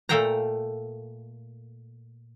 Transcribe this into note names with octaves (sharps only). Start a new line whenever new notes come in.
A#2 A3 A4 F5 G5 A#5